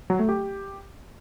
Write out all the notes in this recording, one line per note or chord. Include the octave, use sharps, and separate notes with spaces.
F#3
A3
G4